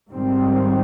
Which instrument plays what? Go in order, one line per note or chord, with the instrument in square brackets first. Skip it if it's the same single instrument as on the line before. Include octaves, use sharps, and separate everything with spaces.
[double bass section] G#2 D#3 G3 C4